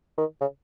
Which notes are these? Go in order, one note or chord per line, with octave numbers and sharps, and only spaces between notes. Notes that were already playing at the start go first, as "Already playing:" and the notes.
D#3
C#3